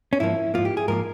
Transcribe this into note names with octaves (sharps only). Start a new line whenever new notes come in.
C#4
G#2 F3 A#3 E4
G#2 F3 A#3 F4
G4
G#4
G#2 F3 A#3 A#4